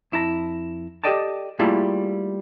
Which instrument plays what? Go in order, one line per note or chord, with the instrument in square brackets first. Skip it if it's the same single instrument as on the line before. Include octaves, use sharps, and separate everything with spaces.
[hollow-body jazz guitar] F2 E4 A5 A#5
G4 A4 D5 D#5 G5 A5
G3 A3 A#3 E4 F4 G#4